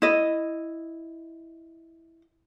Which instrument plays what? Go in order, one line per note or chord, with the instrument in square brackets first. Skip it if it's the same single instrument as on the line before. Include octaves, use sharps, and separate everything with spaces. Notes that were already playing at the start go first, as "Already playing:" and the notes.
[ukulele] E4 D#5